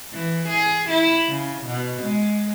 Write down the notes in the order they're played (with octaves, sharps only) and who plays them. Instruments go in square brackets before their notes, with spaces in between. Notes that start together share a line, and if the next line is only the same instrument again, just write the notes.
[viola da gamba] E3
G#4
E4
C#3
B2
G#3